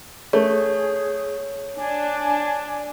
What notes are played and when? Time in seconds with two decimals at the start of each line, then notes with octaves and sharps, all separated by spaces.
0.33 A3 G#4 C#5
1.77 D4 G#5